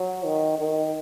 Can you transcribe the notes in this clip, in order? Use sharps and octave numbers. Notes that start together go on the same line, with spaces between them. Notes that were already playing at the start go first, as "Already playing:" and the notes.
Already playing: F#3
D#3
D#3